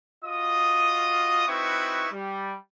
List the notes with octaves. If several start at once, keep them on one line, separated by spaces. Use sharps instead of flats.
F4 F#4 D#5 D#6
C4 D#4 E4 F#4 B4 C#6
G3